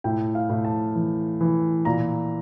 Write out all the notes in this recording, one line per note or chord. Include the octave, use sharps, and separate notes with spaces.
A2 G5
F5
A2
A5
E3
E3
A#2 A#5